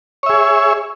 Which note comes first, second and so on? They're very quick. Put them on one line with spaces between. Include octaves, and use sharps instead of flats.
C#5 E5 G#4